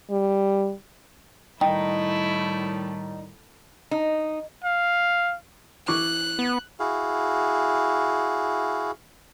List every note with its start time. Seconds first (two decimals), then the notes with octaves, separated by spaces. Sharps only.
0.11 G3
1.61 A2 D#3 G3 A3 D#4 E4 G5
3.91 D#4
4.64 F5
5.88 E3 C#6 D6 F#6
6.39 B3
6.80 E4 F#4 G#4 F5